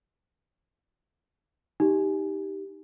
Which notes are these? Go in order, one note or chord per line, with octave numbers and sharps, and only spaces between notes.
D#4 G4